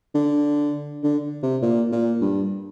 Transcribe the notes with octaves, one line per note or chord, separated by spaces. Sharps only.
D3
D3
C3
A#2
A#2
G2